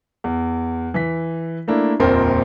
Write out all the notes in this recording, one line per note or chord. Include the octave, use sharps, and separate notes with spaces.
E2
E3 B6
A3 A#3 D4 E4
D#1 A#1 F2 A#2 C4 A#4